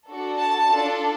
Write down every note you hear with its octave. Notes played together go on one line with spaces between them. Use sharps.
D4 F#4 A4
A5
D4 F4 A4